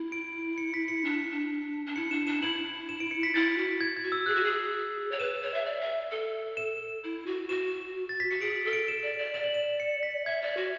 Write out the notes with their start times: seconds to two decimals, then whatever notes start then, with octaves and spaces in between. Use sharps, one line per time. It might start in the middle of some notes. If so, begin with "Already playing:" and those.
Already playing: E4
0.12 D7
0.58 C#7
0.74 B6
0.88 C#7
1.04 D4
1.31 D4
1.86 D4
1.96 E4 C#7
2.11 D4 E7
2.27 D4 E7
2.42 E4 F#7
2.89 E7
3.00 D7
3.11 C#7
3.23 B6
3.34 E4 A6
3.58 F#4
3.81 G#6
3.96 G#6
4.04 F#4
4.12 E6
4.26 G#4 F#6
4.35 F#4
4.44 G#4
5.11 C#5
5.19 B4 E7
5.42 C#5
5.54 E5
5.66 D5
5.81 E5
6.11 A4
6.57 E7
7.04 E4
7.26 F#4
7.49 F#4 E7
8.09 A6
8.20 B6
8.31 F#4 C#7
8.41 G#4 D7
8.65 A4
8.73 D7
8.88 E7
9.03 D5
9.19 D5
9.34 D5 E7
9.44 F#7
9.54 E7
9.80 C#7
10.03 B6
10.26 E5 G#6
10.42 D5
10.57 F#4